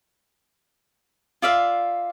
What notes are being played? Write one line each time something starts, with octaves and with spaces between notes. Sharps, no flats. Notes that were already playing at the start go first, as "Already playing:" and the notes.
F4 D5 E5 F5